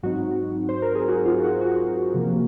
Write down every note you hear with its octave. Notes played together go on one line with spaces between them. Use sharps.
G#2 F#3 C4 D#4 F#4
C5
A#4
G#4
F#4
F4
F#4
F#4
C3 F3 A#3